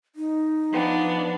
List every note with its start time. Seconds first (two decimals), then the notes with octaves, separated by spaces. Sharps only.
0.16 D#4
0.71 F3 B3 D4